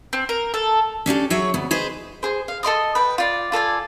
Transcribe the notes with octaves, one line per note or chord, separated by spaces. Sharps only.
C4
A#4
A4
C#4 D4 G4 A4
F#3 G#4 C#5 E5
D2 B3
G#4 B4 C5 D#5
G#4 C5
F5
A4 D#5 C6 D#6
B4 G5
F4 D5
F4 A4 D5 G#5